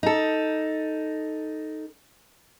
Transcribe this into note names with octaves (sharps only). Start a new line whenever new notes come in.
D#4 A4